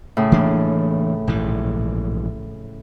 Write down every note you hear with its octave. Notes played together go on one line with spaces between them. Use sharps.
A2 C#3
E3 A#3 D4
A#1 G#2 E3